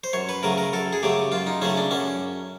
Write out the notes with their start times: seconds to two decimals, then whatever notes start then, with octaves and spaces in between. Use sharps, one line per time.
0.04 C5
0.13 F#2 C#5
0.29 B4
0.43 C#3 F#3 A3 A#4
0.58 A#4
0.73 F#2 A4
0.93 G#4
1.03 C#3 F#3 A3 G4
1.32 F#2 F4
1.47 D#4
1.61 C#3 F#3 A3 C#4
1.77 D4
1.91 F#2 C#4